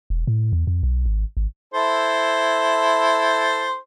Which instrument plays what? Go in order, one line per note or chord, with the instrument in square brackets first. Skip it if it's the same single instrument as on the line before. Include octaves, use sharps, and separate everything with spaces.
[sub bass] E1
A2
E2
F2
B1
G#1
G#1
[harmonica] E4 A4 C5